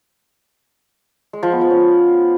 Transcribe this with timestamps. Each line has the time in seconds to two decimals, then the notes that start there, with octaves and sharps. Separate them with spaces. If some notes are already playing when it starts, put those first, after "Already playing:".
1.33 G#3
1.43 F3
1.52 B3
1.61 F3
1.70 C#4